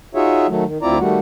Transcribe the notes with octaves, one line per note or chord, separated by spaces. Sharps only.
D#4 F4 F#4 G#4 C#5 E5
D#3 F#3 A3
D#3
D2 C4 E4 F4 D5 A#5
D#3 G3 A3 F#4